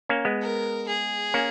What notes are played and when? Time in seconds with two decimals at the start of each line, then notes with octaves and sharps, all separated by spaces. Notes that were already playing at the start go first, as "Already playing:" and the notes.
0.09 A#3 C#4
0.25 G#3 B3
0.41 A#4
0.87 G#4
1.34 A#3 C#4